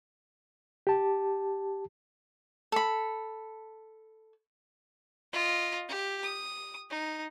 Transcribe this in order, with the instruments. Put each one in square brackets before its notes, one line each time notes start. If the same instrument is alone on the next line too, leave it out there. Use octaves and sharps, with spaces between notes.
[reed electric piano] G4 A5
[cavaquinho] A4 B5
[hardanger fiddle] F4 D#5
G4
D#6
D#4